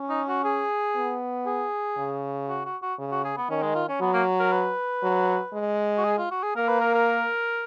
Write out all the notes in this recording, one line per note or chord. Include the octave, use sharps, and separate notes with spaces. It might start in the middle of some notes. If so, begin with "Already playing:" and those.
Already playing: C#4
D#4
F#4
G#4
B3
G#4
C#3
F#4
F#4
F#4
C#3
F#4
G#4
B3
D#3 C#4
G#3
F4
C#4
F#3 B3
A#3
A#4
B4
F#3
G#3
F#4
G#4
F4
F#4
G#4
A#3 A#4
B4
A#4
A#4